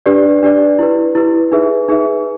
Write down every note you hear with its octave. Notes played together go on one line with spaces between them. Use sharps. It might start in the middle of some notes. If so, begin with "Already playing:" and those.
D4 G4 B4 D5
D4 G4 B4 D5
E4 G4 B4
E4 G4 B4
D#4 G#4 B4 E5
D#4 G#4 B4 E5